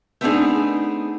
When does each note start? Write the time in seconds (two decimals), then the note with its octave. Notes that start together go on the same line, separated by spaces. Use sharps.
0.21 A3 B3 C4 D4 D#4 G#4